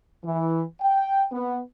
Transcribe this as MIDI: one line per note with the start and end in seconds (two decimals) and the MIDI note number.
0.24 0.62 52
0.81 1.24 79
1.31 1.58 59